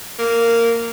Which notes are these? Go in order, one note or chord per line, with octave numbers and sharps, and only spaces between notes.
A#3